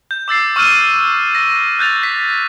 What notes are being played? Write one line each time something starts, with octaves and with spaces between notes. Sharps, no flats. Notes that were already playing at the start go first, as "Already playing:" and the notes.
G6
D6 E6 A6 C7
C#6 E6 F6 G6 D#7
A#6
F#6 G6 A6 F7
B6